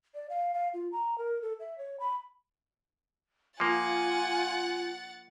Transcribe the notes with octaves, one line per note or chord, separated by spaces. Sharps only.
D5
F5
F5
F4
A#5
A#4
A4
E5
C#5
B5
F3 A#3 F4 F#5 G#5 A6